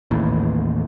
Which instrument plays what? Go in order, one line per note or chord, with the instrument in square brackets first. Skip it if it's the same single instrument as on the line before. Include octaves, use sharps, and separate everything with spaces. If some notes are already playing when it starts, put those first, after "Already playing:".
[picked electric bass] A1 D#2 A2